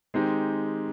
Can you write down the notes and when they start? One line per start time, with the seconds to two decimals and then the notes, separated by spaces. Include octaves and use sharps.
0.14 D#3 G#3 C4 D#4 G4